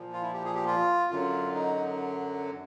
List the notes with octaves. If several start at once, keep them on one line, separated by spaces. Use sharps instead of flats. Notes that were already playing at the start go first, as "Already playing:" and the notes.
Already playing: A#2 F3
F4
E4
G4
G#4
G4
F4
F#2 D3 F#3 F4
D#4